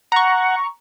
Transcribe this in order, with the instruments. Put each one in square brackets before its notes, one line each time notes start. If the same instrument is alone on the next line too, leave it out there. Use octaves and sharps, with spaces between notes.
[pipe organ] F#5 [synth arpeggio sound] A#5 C#6